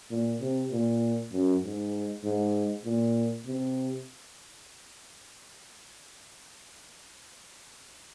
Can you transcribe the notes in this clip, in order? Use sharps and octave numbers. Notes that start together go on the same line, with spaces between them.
A#2
C3
A#2
F#2
G#2
G#2
A#2
C3